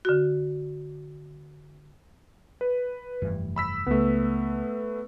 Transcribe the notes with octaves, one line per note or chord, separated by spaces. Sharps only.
D3 F#4
B4
F1 G2 E3
B5 E6 B6
C#2 A3 B3